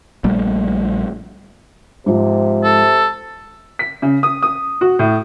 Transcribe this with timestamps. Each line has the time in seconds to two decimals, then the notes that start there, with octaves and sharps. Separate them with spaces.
0.24 A#1 A#2 G3 A3
2.06 G#2 C3 F3
2.64 A4
3.79 B6
4.02 C#3
4.23 D#6
4.43 D#6
4.81 F#4
4.99 A2